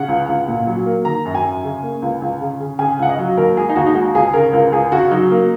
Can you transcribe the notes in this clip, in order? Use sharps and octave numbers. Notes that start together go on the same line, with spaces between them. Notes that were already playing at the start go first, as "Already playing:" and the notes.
Already playing: C#3 F#5
C#2
C#2
A#2
F#3
A#3
D#3 A#5
F#2
G#5
F#2
C#3
A#3
C#2
C#2
C#3
C#3
C#3 G#5
C#2 F#5
D#5
F#3
D#2 A#4
G#3 G#4
D#4
D#2 F#4
D#4
G#3 F#4
C#2 G#4
C#3 A#4
C#2 A#4
C#2 G#4
C#3 F#4
F#3 D#4
A#3